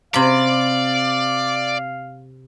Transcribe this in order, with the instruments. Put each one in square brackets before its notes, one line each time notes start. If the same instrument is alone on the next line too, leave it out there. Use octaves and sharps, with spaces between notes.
[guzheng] C3 B5 [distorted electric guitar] D5 [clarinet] F5